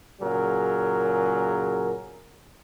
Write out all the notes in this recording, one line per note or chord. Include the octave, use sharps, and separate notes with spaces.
A#2 C#3 F#3 G#4 A#4